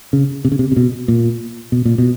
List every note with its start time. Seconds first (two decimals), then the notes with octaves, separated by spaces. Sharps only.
0.13 C#3
0.45 C3
0.52 C#3
0.59 C3
0.72 C3
0.76 B2
1.08 A#2
1.72 B2
1.85 A#2
1.98 B2